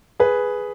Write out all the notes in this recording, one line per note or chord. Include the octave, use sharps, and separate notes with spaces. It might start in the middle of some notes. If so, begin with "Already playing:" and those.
G#4 B4